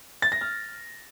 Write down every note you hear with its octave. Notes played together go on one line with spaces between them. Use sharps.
A6
A#6
F6